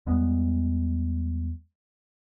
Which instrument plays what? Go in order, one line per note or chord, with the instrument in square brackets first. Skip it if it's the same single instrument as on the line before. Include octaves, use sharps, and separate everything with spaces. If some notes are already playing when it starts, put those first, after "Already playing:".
[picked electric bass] E2 G3 G#3 B3